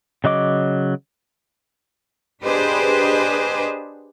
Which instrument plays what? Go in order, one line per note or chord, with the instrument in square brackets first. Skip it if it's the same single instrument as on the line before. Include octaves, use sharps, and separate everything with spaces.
[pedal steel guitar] C#3 F#3 D#5 D6
[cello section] D4 G4 G#4 B4 C5 D#5